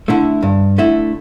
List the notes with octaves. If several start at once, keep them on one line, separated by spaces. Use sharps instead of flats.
D3 A3 E4
G2
D3 A3 E4